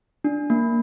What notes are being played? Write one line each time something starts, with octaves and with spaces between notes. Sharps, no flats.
D4
A#3